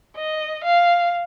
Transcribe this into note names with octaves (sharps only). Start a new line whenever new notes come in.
D#5
F5